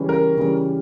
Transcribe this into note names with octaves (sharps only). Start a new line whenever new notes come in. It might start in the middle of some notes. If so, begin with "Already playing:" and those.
Already playing: C#3 E3 G3 C#4
A#4
C#3 E3 G3 C#4